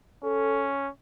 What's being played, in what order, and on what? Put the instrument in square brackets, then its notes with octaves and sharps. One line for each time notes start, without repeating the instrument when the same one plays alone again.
[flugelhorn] C#4 [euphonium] A4